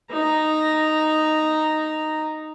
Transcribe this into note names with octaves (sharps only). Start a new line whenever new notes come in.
D#4 A#5